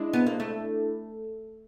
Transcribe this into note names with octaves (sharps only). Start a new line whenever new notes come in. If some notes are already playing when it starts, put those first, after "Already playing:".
Already playing: G#3 D4 E4
B3
A#3
A3